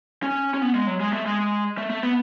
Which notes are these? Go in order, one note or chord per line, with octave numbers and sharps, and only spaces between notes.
C#4
C#4
B3
G#3
F#3
G#3
A3
G#3
A3
A3
B3